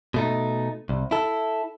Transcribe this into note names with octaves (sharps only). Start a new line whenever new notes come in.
B2 A3 D#4
C2
E4 A4